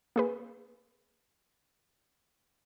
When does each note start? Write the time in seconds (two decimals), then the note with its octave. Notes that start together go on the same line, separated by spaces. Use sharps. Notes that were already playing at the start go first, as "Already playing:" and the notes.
0.16 A#3 G#4 B4